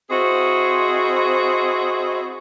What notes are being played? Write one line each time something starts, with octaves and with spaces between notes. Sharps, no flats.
C4 E4 F#4 G#4 C5 D#5